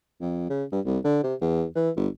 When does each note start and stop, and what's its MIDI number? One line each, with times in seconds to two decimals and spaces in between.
0.21 0.45 41
0.50 0.64 49
0.72 0.80 43
0.85 0.99 36
1.05 1.19 50
1.24 1.35 48
1.41 1.65 40
1.75 1.90 52
1.96 2.08 31